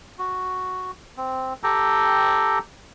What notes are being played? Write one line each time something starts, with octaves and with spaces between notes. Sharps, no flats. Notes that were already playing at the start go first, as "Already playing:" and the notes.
F#4
C4
G4 A4 G5 A#5